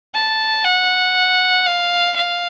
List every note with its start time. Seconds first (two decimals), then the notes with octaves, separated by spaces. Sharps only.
0.14 A5
0.64 F#5
1.66 F5
2.15 F5